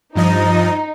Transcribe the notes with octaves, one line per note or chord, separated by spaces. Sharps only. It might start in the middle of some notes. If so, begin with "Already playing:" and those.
G2 F3 D#4 D#5